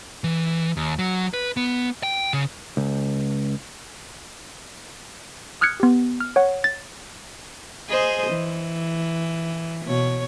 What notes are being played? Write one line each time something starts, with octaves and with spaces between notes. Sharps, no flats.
E3
D#2
F#3
B4
B3
G5
C#3
C#2
D#6 F6 F#6 G#6 C#7
B3 G4
F6
C#5 F#5
A6
G#4 C5 D#5
E3
B2 C#5